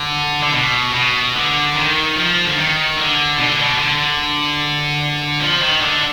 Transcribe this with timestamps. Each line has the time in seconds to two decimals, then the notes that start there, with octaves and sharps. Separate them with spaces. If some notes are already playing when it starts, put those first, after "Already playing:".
Already playing: D3
0.43 D3
0.52 B2
0.94 B2
1.35 D3
1.75 D#3
2.16 F3
2.45 D3
2.57 D#3
2.97 D3
3.37 B2
3.48 D3
3.58 B2
3.79 D3
5.41 F3
5.62 D#3
5.81 D3